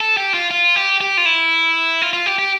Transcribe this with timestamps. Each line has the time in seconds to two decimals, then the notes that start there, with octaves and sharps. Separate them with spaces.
0.01 A4
0.17 G4
0.34 F4
0.51 F4
0.76 G4
1.01 G4
1.17 F4
1.25 E4
2.02 F4
2.13 F4
2.26 G4
2.39 G4